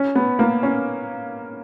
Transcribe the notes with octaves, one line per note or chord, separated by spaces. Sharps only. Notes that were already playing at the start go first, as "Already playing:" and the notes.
Already playing: C#4
B3
A#3
C#4